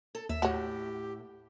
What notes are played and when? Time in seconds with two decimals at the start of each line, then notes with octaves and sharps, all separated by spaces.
0.15 A4
0.29 D#2 E5
0.42 A2 F#4 G4 C#5